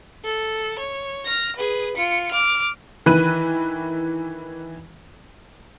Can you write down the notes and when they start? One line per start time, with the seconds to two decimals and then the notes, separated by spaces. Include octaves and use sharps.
0.24 A4
0.79 C#5
1.26 F6 A#6
1.56 G#4 B4
1.97 F4 C#7
2.31 D6 F6
3.06 D#3 E3 B4 F#6 D#7